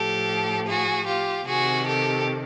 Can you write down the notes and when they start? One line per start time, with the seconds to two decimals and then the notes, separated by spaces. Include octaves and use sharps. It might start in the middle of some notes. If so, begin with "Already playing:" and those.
Already playing: A2 F3 G4 A4
0.67 F#4 G#4
1.07 F4 G4
1.46 C3 D#3 F#4 G#4
1.86 G4 A4